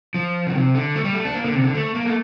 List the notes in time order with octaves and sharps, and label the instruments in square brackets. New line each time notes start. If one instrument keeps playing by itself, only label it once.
[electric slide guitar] F3
D3
C3
D3
A3
G3
A3
D4
A#3
D3
C3
D3
A3
A#3
A3